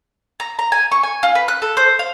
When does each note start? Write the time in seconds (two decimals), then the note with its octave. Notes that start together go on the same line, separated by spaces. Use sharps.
0.40 A#5
0.59 A#5
0.72 G#5
0.92 C#6
1.03 G#5
1.23 F4
1.35 B4
1.48 F#6
1.62 A4
1.77 C5
1.99 F5